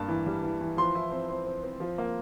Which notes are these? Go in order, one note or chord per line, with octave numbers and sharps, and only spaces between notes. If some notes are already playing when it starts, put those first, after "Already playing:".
Already playing: G2 A#3 A5
E3
G3
E3
E3
F3 C6
E4
C4
C4
C4
C4
F3
A#3